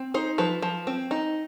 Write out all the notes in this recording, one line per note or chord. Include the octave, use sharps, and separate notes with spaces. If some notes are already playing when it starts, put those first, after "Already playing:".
Already playing: C4
D#4 C5
F3 B4
F3
C4
D#4